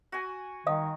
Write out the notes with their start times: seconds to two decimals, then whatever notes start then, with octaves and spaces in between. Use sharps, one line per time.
0.12 F#4 G#5
0.67 D#3 D#5 F5 D#6